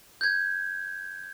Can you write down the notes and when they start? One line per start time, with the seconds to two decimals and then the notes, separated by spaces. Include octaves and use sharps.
0.21 G6 G#6